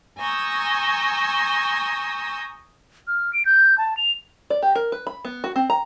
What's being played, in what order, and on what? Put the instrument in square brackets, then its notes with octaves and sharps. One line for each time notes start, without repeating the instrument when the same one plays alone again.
[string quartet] G#5 A#5 C#6 D#6 E6 G6
[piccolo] F6
D7
G6
A5
F7
[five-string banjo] D5
G4
A#4
B4
B5
B3
F#4
C4
A#5